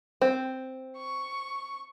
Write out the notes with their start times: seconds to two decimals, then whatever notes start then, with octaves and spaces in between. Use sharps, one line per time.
0.22 C4
0.97 C#6